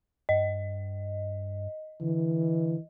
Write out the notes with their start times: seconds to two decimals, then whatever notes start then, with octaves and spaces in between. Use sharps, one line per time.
0.29 G2 D#5
2.01 D3 E3